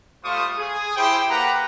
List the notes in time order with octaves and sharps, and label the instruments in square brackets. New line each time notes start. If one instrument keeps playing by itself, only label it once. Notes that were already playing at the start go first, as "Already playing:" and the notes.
[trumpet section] G3 A3 F4 C5 C#6 D#6
G#4
E4 G4 C5 G5
A#3 G4 B4 F#5 A#5